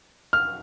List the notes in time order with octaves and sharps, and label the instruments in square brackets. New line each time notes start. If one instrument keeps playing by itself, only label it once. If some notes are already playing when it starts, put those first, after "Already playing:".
[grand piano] F6